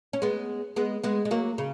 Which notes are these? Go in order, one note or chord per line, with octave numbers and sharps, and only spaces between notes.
C#4
G#3 B3
G#3 B3
G#3 B3
G#3
F#3 A#3
C#3